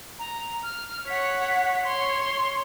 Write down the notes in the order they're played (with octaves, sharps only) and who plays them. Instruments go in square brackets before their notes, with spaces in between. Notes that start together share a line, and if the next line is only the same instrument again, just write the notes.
[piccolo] A#5
F6
[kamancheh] C#5 F#5 [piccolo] B6
[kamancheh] C#5 [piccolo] C6